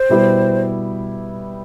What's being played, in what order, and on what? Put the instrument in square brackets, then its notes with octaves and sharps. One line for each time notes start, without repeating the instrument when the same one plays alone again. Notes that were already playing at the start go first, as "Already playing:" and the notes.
Already playing: [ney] C5
[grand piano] B2 G3 B3 E4 G4